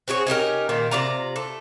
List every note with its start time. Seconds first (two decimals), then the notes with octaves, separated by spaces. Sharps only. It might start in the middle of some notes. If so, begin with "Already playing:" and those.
0.08 C4 F#4 G#4 C#5
0.27 C#4 D#4 G4 A#4
0.69 A#2 D#3 A#3
0.91 C3 F4 D5 A#5
1.36 A3